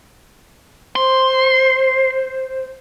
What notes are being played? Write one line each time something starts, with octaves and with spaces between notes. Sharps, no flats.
C5 C6